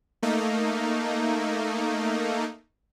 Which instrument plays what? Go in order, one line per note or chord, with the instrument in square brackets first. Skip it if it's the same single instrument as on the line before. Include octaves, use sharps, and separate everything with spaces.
[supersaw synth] A3 A#3 D#4